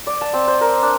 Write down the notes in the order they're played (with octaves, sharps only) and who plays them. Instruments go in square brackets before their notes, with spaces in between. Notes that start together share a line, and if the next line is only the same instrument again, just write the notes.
[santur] D5
A5
C4
C5
A#4
D4